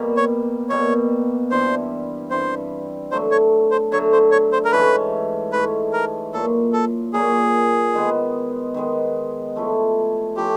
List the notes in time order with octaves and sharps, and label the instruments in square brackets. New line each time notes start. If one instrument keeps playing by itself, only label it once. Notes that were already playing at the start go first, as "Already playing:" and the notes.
Already playing: [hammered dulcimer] B2 G3 A#3
[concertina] C#5
[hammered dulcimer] B2 G3 A#3 [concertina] C#5
[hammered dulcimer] G2 E3 G3 C4 [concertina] C5
[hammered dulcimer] G2 E3 G3 C4 [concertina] C5
[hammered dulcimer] D3 F#3 A3 [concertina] C5
[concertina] C#5
C5
[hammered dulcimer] D3 F#3 A3 [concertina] C#5
[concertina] C5
C#5
C5
A#4
[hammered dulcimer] G#2 E3 A3 C#4 [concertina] B4
[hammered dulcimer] G#2 E3 A3 C#4 [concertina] B4
[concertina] A#4
[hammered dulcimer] A#2 F#3 A#3 [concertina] A4
[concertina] A4
[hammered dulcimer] A#2 F#3 A#3 [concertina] G#4
[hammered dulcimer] D#3 G#3 B3
D#3 G#3 B3
F3 A3 C#4 E4
[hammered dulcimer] F3 A3 C#4 E4 [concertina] G4